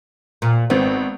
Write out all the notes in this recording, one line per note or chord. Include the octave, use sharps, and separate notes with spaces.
A#2
G#1 B3 C4